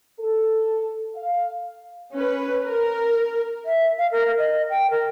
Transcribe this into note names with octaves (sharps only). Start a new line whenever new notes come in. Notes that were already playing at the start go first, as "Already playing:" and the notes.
A4
F5
C#4 B4
A#4
E5
F5
A#4
D#5
G5
A#4